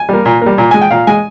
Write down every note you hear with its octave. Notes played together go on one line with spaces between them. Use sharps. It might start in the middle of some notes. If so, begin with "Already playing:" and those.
Already playing: G#5
G3 A#3
A#2
G3 A#3
A#2
G#3 G#5
G5
A#2 F5
G#3 G#5